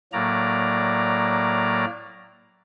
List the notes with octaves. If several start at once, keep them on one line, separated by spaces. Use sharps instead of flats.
A2 F#3 A#3 D5 A#5